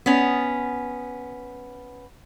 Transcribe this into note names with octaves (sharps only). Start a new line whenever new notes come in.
B3 C#4